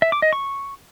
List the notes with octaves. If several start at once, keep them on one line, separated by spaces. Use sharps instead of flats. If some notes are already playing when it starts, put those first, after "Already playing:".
E5
D6
D#5
C#6